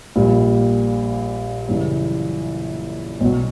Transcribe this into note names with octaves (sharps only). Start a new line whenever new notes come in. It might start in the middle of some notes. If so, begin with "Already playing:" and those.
A#1 A#2 G3
F#2 C#3 E3 G3
B1 B2 F#3